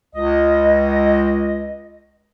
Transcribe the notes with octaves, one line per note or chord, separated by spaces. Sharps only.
C#2 D#5